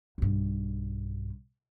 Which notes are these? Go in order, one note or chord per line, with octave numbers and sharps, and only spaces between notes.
B1 G2